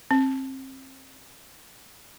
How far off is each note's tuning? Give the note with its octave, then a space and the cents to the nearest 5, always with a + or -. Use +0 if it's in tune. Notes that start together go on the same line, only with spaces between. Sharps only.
C4 +30